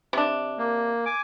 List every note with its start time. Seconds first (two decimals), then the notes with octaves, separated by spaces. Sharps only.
0.13 C3 D4
0.58 A#3
1.06 G#5 D6